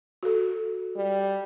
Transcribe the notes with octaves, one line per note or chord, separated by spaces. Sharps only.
F#4 A4
G3